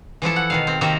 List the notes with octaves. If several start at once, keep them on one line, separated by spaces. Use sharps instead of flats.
E3 F3 E4 A4
F#5
B2 D#3 F5
C4
C3 D#3 A#3 C4 A#4 E5